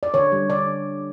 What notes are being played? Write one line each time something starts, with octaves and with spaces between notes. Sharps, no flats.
D5
D3 C#5
G3
D3 D5